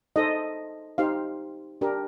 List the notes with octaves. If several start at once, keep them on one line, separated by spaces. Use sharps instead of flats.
D#4 A4 C5 D#5
D#4 G4 C5 F5
D4 G4 A#4